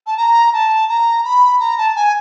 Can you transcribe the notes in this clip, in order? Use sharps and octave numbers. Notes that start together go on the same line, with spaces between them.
A5
A#5
A5
A#5
B5
A#5
A5
G#5